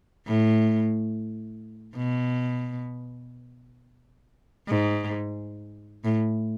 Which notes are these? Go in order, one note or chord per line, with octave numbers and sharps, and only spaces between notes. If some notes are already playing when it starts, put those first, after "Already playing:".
A2
B2
G#2
A2